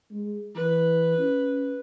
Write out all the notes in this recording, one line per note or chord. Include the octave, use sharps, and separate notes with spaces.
G#3
E3 B4
C#4